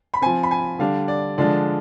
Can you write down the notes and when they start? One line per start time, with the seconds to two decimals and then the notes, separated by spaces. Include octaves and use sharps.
0.14 B5
0.22 F3 C4 G#5
0.43 B5
0.51 G#5
0.79 D3 G3 D4 F5
1.08 D5
1.38 D3 F3 G#3 D4 D5